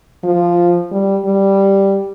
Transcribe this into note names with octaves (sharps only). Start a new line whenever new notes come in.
F3
G3
G3